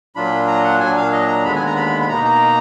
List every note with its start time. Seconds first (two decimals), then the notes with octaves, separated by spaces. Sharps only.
0.15 A#2 F#3 D4 F4 B5
0.48 A#5
0.64 F#5
0.80 A#2 F#3 D4 G#5
0.97 F5
1.13 D#5
1.28 A#5
1.45 D#2 D3 G#3 B3 B5
1.56 G#5
1.66 A#5
1.77 B5
2.01 B5
2.08 B2 A#3 D#4 A#5
2.25 A#5